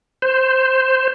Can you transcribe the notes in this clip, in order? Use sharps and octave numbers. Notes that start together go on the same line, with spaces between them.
C5